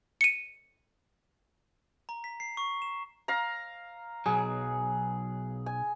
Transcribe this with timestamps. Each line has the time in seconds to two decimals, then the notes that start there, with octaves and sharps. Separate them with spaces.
0.21 C#7 D#7
2.09 A#5
2.24 B6
2.40 C7
2.57 C#6
2.82 E7
3.28 F5 A#5
4.26 B1 F#3 G#4
5.66 G#5